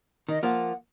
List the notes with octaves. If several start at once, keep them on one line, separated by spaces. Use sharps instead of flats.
D#3 D#5
F3 A#3 F#5